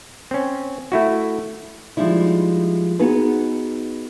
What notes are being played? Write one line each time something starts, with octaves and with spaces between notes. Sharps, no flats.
C4 C#4
A3 E4 F#4
F3 G3 G#3 D#4 E4
B3 D#4 F#4 G#4 B4